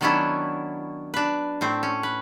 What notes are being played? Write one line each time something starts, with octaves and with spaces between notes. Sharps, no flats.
D#3 F#3 B3 C#4 D4 E4
D4 B4
A2 A3 C4
C#4
B4